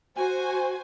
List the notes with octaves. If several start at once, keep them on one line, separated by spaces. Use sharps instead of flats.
F#4 C5 G#5